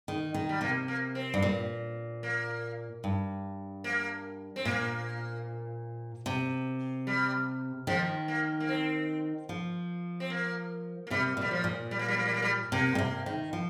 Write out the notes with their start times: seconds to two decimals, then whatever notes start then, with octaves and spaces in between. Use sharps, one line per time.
0.08 D#3
0.34 D#3
0.49 G3
0.61 C3 A#3
0.88 A#3
1.15 C4
1.34 G2
1.42 A#2
2.23 A#3
3.04 G2
3.84 A#3
4.56 C4
4.65 A#2 A#3
6.26 C3
7.07 G3
7.87 D#3 F3
8.28 A#3
8.60 A#3
8.69 C4
9.49 F3
10.20 C4
10.30 A#3
11.07 A#3
11.10 C3 G3
11.37 A#2 G3
11.51 F3
11.64 A#2
11.91 G3
11.99 A#3
12.08 G3
12.17 A#3
12.25 G3
12.34 A#3
12.42 G3
12.72 C3 A#3
12.95 A#2
12.99 C3
13.26 D#3
13.53 F3